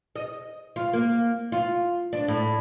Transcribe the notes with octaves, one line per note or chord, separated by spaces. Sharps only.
D#5
F4
A#3
F4
D4
A2